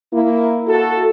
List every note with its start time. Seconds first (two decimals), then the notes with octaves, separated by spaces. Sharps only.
0.12 A#3 E4
0.67 F#4 A4